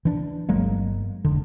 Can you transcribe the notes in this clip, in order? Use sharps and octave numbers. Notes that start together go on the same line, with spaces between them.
E3 D4
G1 F#3 G#3 A#3
F1 D3